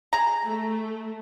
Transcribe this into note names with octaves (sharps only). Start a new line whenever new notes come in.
G#4 A#5
A3